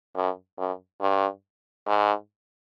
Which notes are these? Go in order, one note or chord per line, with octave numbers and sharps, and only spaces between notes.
F#2
F#2
G2
G#2